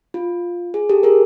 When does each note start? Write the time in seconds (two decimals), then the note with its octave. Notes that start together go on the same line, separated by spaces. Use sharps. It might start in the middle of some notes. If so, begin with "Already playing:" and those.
0.14 F4
0.74 G#4
0.89 G4 A4
1.03 G#4 A#4